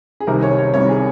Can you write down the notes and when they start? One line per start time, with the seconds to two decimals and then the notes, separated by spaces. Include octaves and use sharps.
0.20 G#4
0.27 C2 C3 D#3 G3 A#4
0.43 C#5
0.58 C#5
0.74 C2 C3 D#3 G3 C#5
0.89 G#4